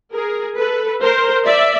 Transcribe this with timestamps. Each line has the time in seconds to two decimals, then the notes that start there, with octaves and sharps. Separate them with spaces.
0.13 G#4 A#4
0.57 A4 B4
1.02 A#4 C5
1.46 D5 E5